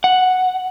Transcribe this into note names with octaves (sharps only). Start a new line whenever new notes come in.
F#5